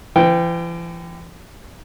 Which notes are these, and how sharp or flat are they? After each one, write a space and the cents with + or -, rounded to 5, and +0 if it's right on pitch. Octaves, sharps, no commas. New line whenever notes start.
E3 +45 G5 +0